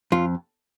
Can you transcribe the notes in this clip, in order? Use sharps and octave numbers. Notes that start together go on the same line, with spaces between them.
F2 F4